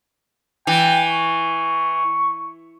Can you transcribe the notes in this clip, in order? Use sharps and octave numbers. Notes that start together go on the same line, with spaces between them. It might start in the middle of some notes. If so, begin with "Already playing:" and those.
E3 G5
C#6